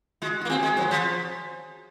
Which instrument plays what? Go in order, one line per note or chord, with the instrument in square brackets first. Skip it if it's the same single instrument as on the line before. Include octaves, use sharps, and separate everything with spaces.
[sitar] G#3 [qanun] F#4
[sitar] A#3 [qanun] F#4
[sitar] C4 [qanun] G#4
[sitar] G#3
[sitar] F#3 [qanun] C5
[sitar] F3